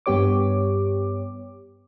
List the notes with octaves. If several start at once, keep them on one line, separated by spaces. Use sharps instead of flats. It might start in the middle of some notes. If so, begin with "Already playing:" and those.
G2 B3 G4 C#5 D6